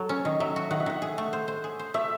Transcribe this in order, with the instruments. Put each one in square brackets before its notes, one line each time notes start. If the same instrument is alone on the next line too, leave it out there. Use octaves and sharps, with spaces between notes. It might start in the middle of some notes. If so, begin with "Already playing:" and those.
Already playing: [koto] F#3 [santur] A4
[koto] C#4 [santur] C#5
[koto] D#3 [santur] D#5
[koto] F#3 [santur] E5
[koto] F#4
[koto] D#3 [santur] F#5
[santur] E5
[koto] D#3 [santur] F#5
[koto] G#4
A3
C5
C5
G#4
C5
[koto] A3 [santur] E5